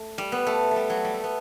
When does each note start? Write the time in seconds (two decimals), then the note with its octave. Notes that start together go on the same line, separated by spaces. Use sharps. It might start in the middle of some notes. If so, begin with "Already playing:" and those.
Already playing: A3
0.18 G3
0.32 B3
0.47 A3
0.71 G3 A3
0.90 F#3
1.04 G3
1.14 A3
1.24 B3